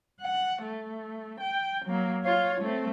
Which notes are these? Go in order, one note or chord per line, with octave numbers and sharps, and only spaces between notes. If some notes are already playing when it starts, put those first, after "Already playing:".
F#5
A3
G5
F#3 A#3
F4 C#5
A3 C4